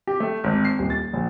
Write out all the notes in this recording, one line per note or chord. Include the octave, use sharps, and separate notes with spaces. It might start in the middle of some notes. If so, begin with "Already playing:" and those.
G4
A3
G#1
C7
D#1
A6
A#1